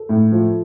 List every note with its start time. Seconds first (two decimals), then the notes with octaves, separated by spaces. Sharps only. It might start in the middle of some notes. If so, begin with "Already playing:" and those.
Already playing: A4
0.09 A2
0.32 F3